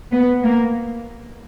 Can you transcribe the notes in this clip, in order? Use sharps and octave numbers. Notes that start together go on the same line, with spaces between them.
B3
A#3